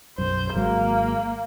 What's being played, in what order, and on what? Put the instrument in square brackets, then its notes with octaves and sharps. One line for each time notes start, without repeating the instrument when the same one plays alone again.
[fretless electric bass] B1 F#2 [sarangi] C5
[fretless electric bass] G#1 F#3 G#3 [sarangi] A#3